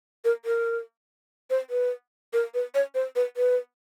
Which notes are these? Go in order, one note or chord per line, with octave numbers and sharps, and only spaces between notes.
A#4
A#4
C5
B4
A#4
B4
C#5
C5
B4
B4